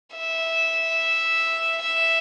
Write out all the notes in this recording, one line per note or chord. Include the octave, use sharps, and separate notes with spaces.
E5
E5